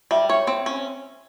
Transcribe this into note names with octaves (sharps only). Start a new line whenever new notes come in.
G3 E5
C#5
C4
C#4